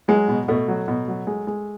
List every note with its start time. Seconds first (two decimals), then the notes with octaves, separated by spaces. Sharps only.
0.08 F#3 G#3
0.28 B2
0.48 B2 A3
0.68 F#3
0.88 B2
1.08 F#3
1.27 G#3
1.47 G#3